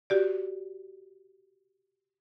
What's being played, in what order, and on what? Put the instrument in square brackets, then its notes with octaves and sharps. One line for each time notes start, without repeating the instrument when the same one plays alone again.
[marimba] F#4 G4 D5